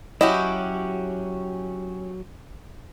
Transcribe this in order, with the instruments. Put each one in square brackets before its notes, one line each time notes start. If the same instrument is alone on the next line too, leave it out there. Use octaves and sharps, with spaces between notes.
[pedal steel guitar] F#3 [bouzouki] C#4 F#4 G4 [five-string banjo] E4 D#5